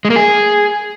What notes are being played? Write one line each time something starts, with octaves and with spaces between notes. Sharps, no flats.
G#3
A#3
G#4